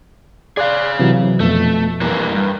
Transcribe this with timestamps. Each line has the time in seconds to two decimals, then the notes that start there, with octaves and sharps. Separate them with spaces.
0.57 G#4 D5 F5 C6 F#6
0.99 C3 E3 F#3
1.40 F2 B2 A3
2.01 G2 E3 A#3
2.35 G2